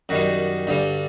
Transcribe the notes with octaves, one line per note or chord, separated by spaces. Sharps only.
F#2 D#3 G3 F#4
G2 D3 G3